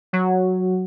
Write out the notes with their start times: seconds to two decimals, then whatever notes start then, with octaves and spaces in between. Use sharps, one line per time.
0.13 F#3